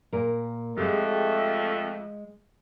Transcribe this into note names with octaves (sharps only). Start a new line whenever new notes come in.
A#2 A#4
F2 G#3 A3 G4